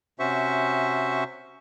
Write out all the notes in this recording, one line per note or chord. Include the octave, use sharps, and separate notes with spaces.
C3 C#4 F#4 C5 E5 C#6